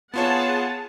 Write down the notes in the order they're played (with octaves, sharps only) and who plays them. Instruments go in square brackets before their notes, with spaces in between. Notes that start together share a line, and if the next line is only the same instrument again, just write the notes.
[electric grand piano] B3 F4 C#5 [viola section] G#4 F#5 A5